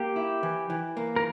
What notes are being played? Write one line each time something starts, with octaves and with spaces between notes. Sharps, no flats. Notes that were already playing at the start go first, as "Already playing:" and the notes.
Already playing: A#3 G4
E4
E3
E3
A#3
A#4